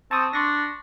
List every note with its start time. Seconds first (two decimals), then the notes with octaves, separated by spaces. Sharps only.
0.11 C4 A5 C#6 D#6
0.33 D4 C6 C#6 A#6